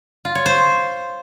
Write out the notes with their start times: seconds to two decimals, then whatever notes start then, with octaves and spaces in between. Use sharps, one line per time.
0.25 F4
0.35 C#5
0.46 C5